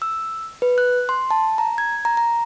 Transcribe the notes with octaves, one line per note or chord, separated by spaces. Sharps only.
E6
B4
F#6
C6
A5
A#5
G#6
A#5
A#5